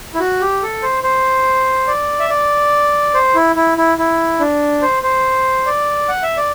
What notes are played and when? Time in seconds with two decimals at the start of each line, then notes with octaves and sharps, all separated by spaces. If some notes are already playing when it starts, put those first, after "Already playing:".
0.14 E4
0.20 F#4
0.41 G4
0.62 A4
0.83 C5
1.03 C5
1.87 D5
2.20 E5
2.29 D5
3.14 C5
3.35 E4
3.56 E4
3.78 E4
3.98 E4
4.40 D4
4.82 C5
5.03 C5
5.66 D5
6.08 F#5
6.23 E5
6.37 D5